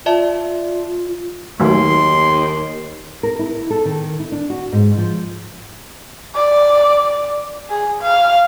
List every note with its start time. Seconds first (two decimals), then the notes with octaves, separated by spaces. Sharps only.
0.06 F4 D5 E5 A5
1.60 D#2 D#3 F#3 A3 C6
3.23 A#4
3.39 E4
3.70 A4
3.85 D#3
4.20 E4
4.32 D4
4.50 F#4
4.72 G#2
4.98 F3
6.35 D5
7.70 G#4
8.01 F5